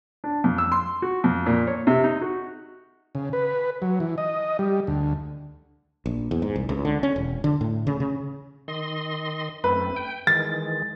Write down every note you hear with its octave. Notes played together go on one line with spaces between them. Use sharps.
D4
F2
E6
C6
F#4
F2
A#2
C#5
C3
D#4
F#4
C#3
B4
F#3
E3
D#5
G3
D2
A#1
E2
G#2
C2
C#2
D3
C#4
E1
D3
A2
C#3
C#3
D#3 D#5 C6
F#2 A3 C4 B4
G5
D#3 E3 G#3 A6